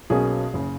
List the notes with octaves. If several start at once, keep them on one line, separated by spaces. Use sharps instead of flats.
B1 B2 A#3 C#4 G#4
F#1 C#3